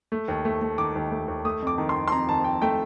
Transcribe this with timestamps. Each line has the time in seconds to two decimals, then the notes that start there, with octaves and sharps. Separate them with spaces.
0.12 A3
0.28 D#2
0.45 A3
0.62 A3
0.78 D#3 D6
0.95 D#2
1.11 A3
1.28 D#2
1.45 A3 D#6
1.62 F2 D6
1.78 D#3
1.89 C6
1.95 F2
2.08 C6
2.12 F2 A#5
2.29 D#3 A5
2.44 F2 G5
2.62 A3 G5